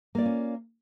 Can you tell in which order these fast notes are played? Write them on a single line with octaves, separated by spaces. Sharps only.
A#3 D5 F4 C#4